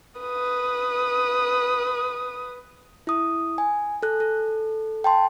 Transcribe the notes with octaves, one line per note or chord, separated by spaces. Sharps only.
B4 D#6
E4 D#6
G#5
A4 F#6
A4
G5 A5 C6